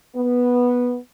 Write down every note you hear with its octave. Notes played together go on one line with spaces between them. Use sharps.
B3